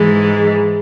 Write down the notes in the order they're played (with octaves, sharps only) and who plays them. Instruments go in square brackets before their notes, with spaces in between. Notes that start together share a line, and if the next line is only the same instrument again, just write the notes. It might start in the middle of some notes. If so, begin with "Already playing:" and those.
Already playing: [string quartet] G#2 E3 G#3